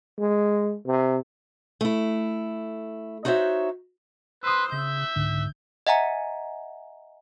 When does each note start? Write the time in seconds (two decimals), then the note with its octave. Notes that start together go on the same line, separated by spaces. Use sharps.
0.18 G#3
0.86 C3
1.81 A3 E4
3.25 D#4 F#4 C5 C#5 E5
4.43 B4 C5 C6 D#6 E6
4.72 C#3 E5 G6
5.16 C2 G#2 D3
5.87 D#5 E5 F#5 G#5 A#5